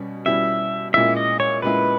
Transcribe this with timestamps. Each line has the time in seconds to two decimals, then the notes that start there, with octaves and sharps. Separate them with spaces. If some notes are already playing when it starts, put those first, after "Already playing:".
Already playing: B2 G3 C#4
0.26 B2 G3 C#4 E4 E5
0.94 A#2 G#3 C#4 E4 E5
1.17 D#5
1.40 C#5
1.62 A#2 G#3 C#4 E4 B4